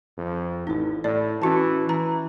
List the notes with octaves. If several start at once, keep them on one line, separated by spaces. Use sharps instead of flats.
F2
A1 D#4 E4
A2 D5
E3 C#4 F#4 A5
E3 A#5